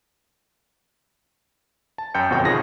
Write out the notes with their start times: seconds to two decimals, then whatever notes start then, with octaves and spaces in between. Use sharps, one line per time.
1.98 A5
2.14 F#2 C#4 G5 G6 C#7
2.30 G1 F2 B2 F#4 C#5 G5
2.43 B1 D#3 F4 G#4 A#6